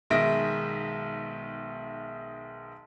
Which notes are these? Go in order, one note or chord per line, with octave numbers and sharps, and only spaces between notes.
B1 D#3 G#3 E5 A#6 D7